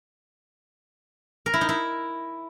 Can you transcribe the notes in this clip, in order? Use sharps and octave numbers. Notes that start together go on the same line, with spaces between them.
A#4
E4
D#4
E4